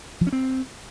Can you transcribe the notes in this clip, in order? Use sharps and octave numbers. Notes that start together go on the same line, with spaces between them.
F3
C#4
C4